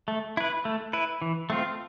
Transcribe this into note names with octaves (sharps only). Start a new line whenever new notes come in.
A3
E4 B4
A3
E4 B4
E3
A3 C4 F4